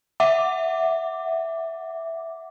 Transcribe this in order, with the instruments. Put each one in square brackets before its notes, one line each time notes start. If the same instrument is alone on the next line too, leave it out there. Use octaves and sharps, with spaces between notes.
[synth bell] E5 F#5 D6